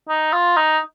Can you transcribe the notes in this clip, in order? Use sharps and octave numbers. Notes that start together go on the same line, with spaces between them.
D#4
F4
D#4